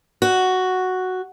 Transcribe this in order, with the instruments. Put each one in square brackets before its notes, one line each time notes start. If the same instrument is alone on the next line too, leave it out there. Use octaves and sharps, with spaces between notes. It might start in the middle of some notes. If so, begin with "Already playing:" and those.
[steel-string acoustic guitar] F#4